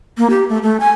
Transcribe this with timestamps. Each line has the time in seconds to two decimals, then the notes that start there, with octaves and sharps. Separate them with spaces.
0.18 A#3
0.30 G4
0.49 A3
0.63 A3
0.80 G#5